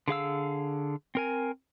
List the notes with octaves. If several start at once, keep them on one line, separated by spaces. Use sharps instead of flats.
D3 G#4 F5 E6
C4 A#4 G#5